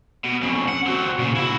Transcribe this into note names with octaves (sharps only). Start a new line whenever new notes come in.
B2
F2 C#3
F#5
C4 F#4
A#2 C#3
E4 F#4